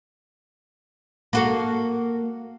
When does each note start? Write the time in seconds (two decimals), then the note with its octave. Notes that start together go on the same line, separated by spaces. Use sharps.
1.33 A#3 F#4 A4